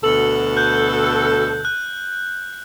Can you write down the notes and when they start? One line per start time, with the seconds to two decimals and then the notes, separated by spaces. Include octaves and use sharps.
0.04 D2 B2 A4 F#7
0.57 F#6 G6
1.65 F#6